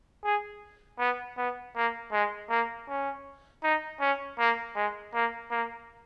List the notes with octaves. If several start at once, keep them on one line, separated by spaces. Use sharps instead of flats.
G#4
B3
B3
A#3
G#3
A#3
C#4
D#4
C#4
A#3
G#3
A#3
A#3